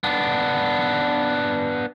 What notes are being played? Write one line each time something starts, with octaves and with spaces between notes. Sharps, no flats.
B3 D4